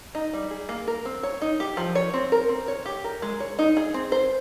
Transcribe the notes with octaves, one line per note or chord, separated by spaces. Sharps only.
D#4
G3
G#4
A#3
A#4
C4
C#5
D#4
G4
F3
C#5
C4
A#4
C4
C#5
G4
A#4
G#3
C#5
D#4
G#4
C4
C5